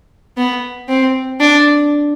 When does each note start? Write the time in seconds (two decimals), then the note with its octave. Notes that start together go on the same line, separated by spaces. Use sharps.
0.37 B3
0.89 C4
1.40 D4